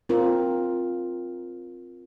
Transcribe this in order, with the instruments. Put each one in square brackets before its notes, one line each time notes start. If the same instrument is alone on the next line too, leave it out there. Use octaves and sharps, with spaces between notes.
[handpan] C4 F4 A#4